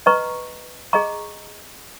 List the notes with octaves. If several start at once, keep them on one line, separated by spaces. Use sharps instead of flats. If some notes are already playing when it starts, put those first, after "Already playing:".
B4 D#5 A#5 C#6
G#4 D#5 A#5 C#6